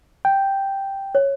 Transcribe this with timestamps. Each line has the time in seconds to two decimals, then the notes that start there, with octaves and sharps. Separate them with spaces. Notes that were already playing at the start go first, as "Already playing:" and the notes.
0.25 G5
1.15 C#5